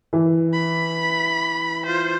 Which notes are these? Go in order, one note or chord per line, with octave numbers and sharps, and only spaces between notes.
E3
B5
F4 C5